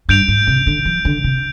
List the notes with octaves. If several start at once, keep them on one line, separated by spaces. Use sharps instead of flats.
G2 G6 D7 F7
G#2
C3
D3
F3
D3
C3